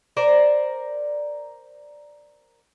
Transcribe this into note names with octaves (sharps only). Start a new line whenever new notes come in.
A#4 C5 D5